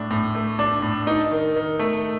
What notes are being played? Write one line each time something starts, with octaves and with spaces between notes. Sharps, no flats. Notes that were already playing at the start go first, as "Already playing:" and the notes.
Already playing: A2 D4
A2
A3
D4
A2
D#4
D#3
D#3
A3